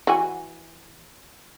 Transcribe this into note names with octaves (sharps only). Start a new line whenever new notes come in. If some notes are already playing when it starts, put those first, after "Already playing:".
E3 F#4 G#5